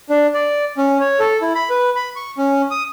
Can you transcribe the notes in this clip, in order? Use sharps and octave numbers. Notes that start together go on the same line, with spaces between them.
D4
D5
C#4
C#5
A4
E4
B5
B4
B5
C#6
C#4
D#6